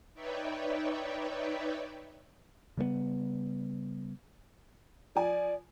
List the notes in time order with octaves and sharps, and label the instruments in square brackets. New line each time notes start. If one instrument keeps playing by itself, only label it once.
[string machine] D#4 B4 C#5 D5 E5 G5
[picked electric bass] C#3 G3 G#3 B3
[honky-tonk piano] F3 G#5 [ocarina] D5